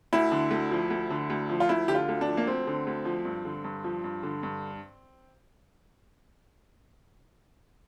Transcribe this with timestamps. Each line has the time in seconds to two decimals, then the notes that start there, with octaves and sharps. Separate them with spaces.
0.13 D2 E4
0.32 D3
0.51 D2
0.71 F3
0.90 D2
1.10 D3
1.30 D2
1.50 F3
1.60 F4
1.69 D2 E4
1.88 D3 G4
1.95 F4
2.09 D2
2.21 D4
2.28 F3
2.37 A#3
2.47 D2 C4
2.67 D3
2.87 D2
3.05 F3
3.25 G2
3.45 D3
3.64 G2
3.84 F3
4.04 G2
4.23 D3
4.43 G2